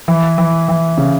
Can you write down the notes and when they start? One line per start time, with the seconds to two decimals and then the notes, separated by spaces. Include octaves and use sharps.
0.08 E3
0.38 E3
0.68 E3
0.98 C#3